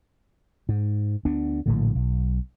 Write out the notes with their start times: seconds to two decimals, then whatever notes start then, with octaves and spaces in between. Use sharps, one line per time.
0.69 G#2
1.25 D2 B3 D4
1.66 A#1 A2 D3
1.95 B1